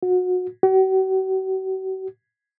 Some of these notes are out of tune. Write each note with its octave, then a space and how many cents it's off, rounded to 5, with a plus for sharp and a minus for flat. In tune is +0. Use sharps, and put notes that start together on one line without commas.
F#4 -25
F#4 +45